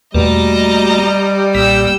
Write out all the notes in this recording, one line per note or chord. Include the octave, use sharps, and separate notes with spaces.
E2 B2 G3 A3 A#3 F#4 D#5 A#5
B1 A#2 A#3 G5 E6 B6